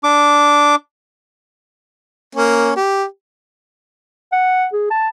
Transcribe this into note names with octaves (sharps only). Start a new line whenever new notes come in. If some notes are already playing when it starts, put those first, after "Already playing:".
D4 D6
A#3 C#4
G4
F#5
G#4
A5